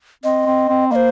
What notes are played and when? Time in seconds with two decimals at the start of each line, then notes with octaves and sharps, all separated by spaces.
0.24 C4 D#5
0.46 C4
0.69 C4
0.91 A#3 C5 D#5